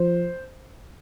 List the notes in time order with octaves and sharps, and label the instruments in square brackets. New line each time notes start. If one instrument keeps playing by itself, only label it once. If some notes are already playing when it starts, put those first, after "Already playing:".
Already playing: [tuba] F3 [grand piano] C5